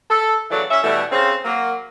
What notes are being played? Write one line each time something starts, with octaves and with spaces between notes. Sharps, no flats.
A4
C#3 E3 F#3 A3 D5
C#4 E5
B2 E3 G3 A3
C#3 C4
F#3 A#3